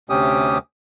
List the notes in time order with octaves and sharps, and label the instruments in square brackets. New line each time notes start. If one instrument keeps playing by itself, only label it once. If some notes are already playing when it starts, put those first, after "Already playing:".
[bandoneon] D2 C3 C#4 G4 D#6